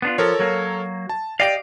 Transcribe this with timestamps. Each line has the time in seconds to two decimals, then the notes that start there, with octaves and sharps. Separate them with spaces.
0.02 B3 D4 F4
0.18 F3 A4 A#4 C#5
0.40 F#3 A#3
1.09 A5
1.40 G4 D5 D#5 F5 G5 D7